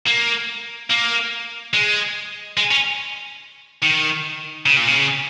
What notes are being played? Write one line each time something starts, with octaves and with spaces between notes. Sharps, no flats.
A#3
A#3
G#3
G#3
C#4
D#3
C#3
A#2
C#3